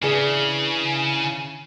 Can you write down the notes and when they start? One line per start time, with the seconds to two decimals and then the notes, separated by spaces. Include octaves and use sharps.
0.02 C#3 E3 D4 G#4